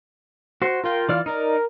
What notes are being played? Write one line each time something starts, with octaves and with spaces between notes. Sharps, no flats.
F#4 C5
F4 A#4 G5
E3 D5 F6
D#4 A#4 D5